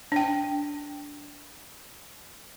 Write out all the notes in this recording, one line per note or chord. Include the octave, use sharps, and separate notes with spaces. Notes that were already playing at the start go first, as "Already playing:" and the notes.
D4 G5